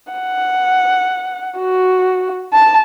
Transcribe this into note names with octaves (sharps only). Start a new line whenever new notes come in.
F#5
F#4
A5